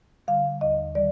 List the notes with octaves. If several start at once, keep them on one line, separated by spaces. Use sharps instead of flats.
D3 G3 F5
D#2 D#5
D#3 G3 D5